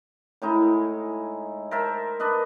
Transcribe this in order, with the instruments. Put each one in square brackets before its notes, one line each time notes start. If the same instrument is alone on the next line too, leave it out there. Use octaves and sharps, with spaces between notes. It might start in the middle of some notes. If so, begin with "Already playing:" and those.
[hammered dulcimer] A2 G#3 D#4 E4
A#4 C5 E5 A5
D4 B4 D#5